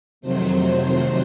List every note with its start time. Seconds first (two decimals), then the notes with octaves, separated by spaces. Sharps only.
0.21 F2 C3 D#3 F#3 A3 C5